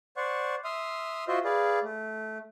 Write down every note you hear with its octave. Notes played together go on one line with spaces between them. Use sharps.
C5 D5 F#5 C#6
E5 C6 D#6 F6
F4 F#4 C5 D#5 E5
G#4 B4 D5 F5
A3